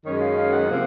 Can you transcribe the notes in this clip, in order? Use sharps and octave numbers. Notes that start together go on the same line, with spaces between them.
F#2 D#3 G#3 C#4 C#5
F5
F5
F#5
C3 F3 A#3